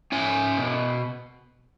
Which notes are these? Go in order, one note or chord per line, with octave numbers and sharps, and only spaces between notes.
C#4 E5 G#5
B2